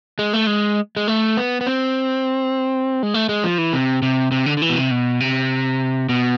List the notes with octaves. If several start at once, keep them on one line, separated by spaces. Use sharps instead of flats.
G#3
A3
G#3
G#3
A3
B3
B3
C4
G#3
A3
G#3
F3
E3
C3
C3
C3
D3
D3
E3
B2
C3
B2
C3
B2